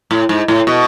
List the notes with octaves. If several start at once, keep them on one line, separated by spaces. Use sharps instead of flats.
A2
G#2
A2
B2